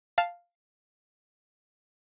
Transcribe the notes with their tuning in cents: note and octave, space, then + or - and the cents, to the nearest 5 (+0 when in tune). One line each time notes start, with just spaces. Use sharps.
F5 +0 A5 +0